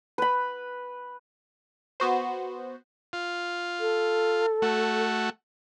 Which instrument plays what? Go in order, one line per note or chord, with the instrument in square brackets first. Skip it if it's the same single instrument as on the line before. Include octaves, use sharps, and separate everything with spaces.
[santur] B4 B5
[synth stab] B3 F#4 C5
[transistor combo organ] F4
[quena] A4
[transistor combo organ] A3 F#4